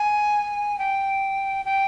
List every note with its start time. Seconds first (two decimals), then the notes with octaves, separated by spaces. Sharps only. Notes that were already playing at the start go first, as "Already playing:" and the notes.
Already playing: G#5
0.79 G5
1.65 G5